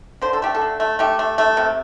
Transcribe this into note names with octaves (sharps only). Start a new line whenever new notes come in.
D3 C5
A4
A3 G4
A4
D3
A3
A3 G4
A3
A3
C3